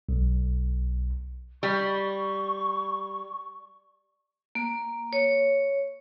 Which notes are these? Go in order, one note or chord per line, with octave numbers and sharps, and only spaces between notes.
B1
G3 C#6
A#3
C#5